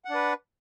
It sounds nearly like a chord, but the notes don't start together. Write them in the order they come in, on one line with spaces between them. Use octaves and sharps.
F#5 D4 B4